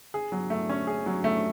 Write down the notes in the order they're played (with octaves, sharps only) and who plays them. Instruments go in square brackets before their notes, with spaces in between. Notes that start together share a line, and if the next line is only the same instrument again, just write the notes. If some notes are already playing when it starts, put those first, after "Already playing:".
[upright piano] G#4
F#3
A3
C#4
G#4
F#3
A3